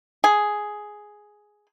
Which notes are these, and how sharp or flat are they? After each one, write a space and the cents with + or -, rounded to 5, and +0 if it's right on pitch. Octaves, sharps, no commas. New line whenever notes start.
G#4 +5